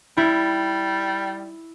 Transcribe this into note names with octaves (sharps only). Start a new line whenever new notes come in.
G3 E4